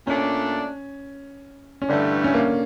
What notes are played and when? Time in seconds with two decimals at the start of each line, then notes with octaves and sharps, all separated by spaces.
0.07 A#2 A3 C#4 D4
1.82 C#4
1.89 G2 D3 E3 A3 D4
2.24 C#4
2.34 A#3